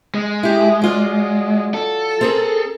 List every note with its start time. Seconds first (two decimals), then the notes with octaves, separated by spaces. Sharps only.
0.14 G#3
0.43 E4 G4
0.82 F#3 F4 D5
1.74 A4
2.21 C4 G#4 A#4